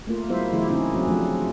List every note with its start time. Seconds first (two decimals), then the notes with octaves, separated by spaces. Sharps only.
0.07 A3 A#3 F4
0.29 F#3 G#3 B3 E4 C5 E5
0.52 C#3 E3 F#3 A3 E4 G4
0.68 C#3 C4 C#4 D#4 E4
0.93 F#3 C4 C#4 F#4
1.07 F3 F#3 A3 D4